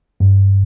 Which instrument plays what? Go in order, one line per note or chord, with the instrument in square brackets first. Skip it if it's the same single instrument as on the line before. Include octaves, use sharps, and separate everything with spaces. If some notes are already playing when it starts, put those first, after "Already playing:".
[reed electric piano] G2